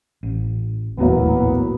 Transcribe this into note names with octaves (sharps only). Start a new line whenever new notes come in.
A1
D#1 A#1 E2 A2 F#3 A#3 B3